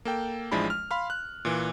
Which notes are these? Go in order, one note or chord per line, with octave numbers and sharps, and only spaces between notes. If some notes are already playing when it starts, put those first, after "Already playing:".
A#3 A4 G5
A1 F3 G#3 D4 E4 B5
F6
F5 B5 C6 F6
F#6
A#2 E3